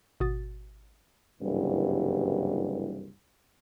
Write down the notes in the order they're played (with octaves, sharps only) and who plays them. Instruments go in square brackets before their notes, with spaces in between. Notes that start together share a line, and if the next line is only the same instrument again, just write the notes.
[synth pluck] G#1 B2 F#4 D#6 A6
[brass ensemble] F#1 C2 G2 E3